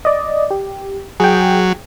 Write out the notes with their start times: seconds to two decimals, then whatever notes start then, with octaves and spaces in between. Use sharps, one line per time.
0.05 D5 D#5
0.51 G4
1.20 F#3 G#4 G5